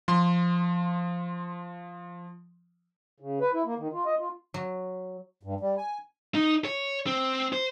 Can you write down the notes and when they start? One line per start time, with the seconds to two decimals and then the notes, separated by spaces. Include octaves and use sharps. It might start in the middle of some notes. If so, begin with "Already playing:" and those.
0.08 F3 C6
3.20 C#3
3.41 B4
3.54 E4
3.66 A#3
3.78 D#3
3.93 F4
4.06 D#5
4.19 F4
4.54 F#3
5.43 G2
5.60 G3
5.78 G#5
6.35 D#4
6.65 C#5
7.07 C4
7.53 C5